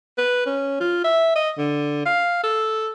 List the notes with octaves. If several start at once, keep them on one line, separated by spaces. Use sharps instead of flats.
B4
C#4
F4
E5
D#5
D3
F5
A4